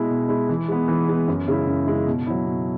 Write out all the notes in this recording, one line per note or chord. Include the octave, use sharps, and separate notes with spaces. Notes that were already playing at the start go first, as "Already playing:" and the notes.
Already playing: B2 G#3 E4
B2
G#3 E4
E3
G#3 B3
E3
G#3 B3
F#2
C#3 G#3 E4
F#2
C#3 G#3 E4
B2
F#3 E4
B2